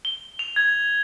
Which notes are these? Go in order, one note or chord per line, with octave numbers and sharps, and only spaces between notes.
G7
F7
G#6